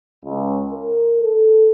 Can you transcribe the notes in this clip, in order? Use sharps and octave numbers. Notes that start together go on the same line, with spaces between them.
C#2
A#4
A4